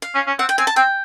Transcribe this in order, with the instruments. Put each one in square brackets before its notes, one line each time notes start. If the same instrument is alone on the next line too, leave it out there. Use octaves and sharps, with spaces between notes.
[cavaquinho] F5
[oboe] C#4
C#4
[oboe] C4 [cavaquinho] F#5
[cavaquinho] G5
[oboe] C4 [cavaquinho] G#5
[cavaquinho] A5
[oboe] C4 [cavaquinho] G5